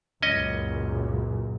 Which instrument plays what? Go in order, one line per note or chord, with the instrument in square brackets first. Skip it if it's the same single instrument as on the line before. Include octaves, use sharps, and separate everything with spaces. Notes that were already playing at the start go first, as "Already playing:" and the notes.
[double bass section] C#2 F#2 A#2 [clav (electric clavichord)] C#4 D#5